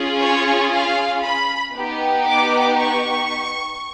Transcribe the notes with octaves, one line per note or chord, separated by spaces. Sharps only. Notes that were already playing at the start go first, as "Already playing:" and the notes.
Already playing: C#4 F4 G#4
C#5
F5
B5
B3 D#4 G4
D6
C#6